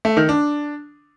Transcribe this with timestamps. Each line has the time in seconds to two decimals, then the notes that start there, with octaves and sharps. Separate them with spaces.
0.05 A3
0.17 D#3
0.29 D4